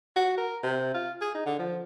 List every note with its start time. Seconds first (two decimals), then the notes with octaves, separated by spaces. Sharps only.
0.16 F#4
0.38 A#4
0.63 C3
0.94 F4
1.21 G#4
1.34 D#4
1.46 D3
1.59 F3